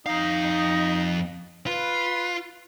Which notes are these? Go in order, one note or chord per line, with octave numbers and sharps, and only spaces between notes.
F2 D#4 F5
F4 B4